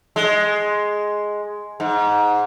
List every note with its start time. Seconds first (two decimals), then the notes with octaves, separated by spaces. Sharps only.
0.16 G#3
1.80 G#2